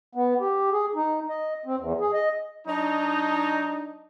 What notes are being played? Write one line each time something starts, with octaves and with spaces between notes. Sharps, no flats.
B3
G4
G#4
D#4
D#5
C4
E2
G#4
D#5
F#3 D4 D#4